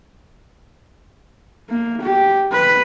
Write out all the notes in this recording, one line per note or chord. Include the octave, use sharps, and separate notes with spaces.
A#3
G4
B4